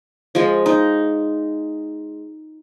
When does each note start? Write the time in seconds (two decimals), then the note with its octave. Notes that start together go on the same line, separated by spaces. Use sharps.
0.35 F3 G#3
0.66 D#4